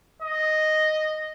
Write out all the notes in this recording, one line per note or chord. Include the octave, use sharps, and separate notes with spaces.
D#5